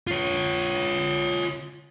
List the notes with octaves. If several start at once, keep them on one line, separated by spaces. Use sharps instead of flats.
F4 C#5